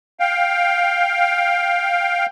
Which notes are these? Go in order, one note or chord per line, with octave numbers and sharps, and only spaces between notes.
F5 G5